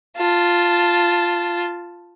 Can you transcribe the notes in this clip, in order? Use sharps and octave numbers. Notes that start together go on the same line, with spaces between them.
F4 A5